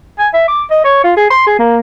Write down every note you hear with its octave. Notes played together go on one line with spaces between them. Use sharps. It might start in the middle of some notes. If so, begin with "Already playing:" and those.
G#5
E5
D6
D#5
C#5
F4
G#4
C6
G#4
A#3